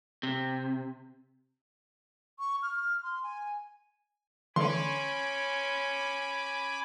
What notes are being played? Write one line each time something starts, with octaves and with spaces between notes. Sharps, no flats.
C3
C#6
F6
C6
G#5
D3 E3 A3 C#4 G#5 B5 C6 D6